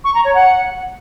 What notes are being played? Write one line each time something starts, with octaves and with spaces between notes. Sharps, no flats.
C#6
A#5
C#5
F#5